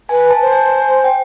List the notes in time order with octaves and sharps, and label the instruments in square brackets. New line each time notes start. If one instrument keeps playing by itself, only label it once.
[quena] B4 [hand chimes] G#5
[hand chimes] A5
[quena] C5
[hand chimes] G#5
G#5
G5